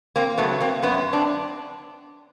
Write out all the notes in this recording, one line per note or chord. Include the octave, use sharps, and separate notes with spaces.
A#3 C4
C#3 F#3 A3 B3
A#3 C4
F#2 B3 C#4
C4 D4